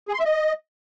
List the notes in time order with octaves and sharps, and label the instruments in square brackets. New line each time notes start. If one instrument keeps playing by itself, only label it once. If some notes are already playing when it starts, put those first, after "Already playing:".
[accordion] G#4
C6
E5
D#5